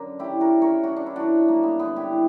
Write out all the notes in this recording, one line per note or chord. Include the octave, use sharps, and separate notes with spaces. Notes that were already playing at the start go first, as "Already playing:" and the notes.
Already playing: F#2 D3 D4 A#4
F#3 E4 G4
F#4 A#4
F#2
A#4 C#5
F#3 D4 F#4
D4
E4
F#2 D4 F#4
G2 A#3
B3
D3 B3
E4 G4
G3